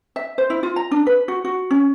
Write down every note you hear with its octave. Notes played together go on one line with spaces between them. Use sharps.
E5
C5
E4
F4
A#5
D4
B4
F#4
F#4
C#4